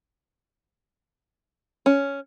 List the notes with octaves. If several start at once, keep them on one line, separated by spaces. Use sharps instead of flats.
C#4